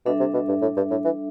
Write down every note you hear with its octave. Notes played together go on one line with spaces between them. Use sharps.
B2 G3 D4 A4 E5
C3
B2
G2
A2
G2
A2
E3